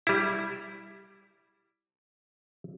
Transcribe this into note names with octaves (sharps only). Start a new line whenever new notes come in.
G3 E4